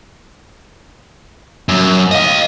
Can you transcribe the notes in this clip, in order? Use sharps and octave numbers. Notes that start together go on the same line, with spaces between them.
F#2
D#5 F5